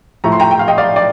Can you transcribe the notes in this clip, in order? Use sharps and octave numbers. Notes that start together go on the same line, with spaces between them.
A2 F3 A3 A#5
C6
G5 A#5
G5
F5
D#5 G5
D5 F5
D5